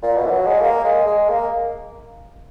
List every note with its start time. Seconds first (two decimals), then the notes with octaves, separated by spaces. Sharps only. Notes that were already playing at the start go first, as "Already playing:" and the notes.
0.02 A#2
0.16 B2
0.26 E3
0.31 F#3
0.46 G#3
0.61 A#3
0.84 G#3
1.07 G#3
1.29 A#3